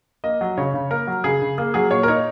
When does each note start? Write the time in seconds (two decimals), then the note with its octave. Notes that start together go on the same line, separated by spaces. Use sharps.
0.24 A#3 D#5
0.41 F#3
0.58 C#3 C#5
0.74 C#3
0.90 A#3 A#4
1.07 F#3
1.24 C#3 G#4
1.42 C#3
1.58 A#3 G#4
1.74 F#3 G#4
1.91 A#2 C#5
2.03 A#4
2.08 D#4 C#5